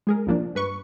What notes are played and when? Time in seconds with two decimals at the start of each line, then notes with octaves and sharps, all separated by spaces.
0.07 G#3 G#4 A#4
0.27 C2 A#2 F3 A#3 D4
0.55 G2 B4 C#6